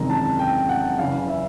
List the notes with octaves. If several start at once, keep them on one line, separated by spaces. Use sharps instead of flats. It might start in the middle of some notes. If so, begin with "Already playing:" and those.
Already playing: F#1 E2 C3 D#3 G#3 A#5
A5
G5
F#5
F#1 E2 C#3 E3 F5
E5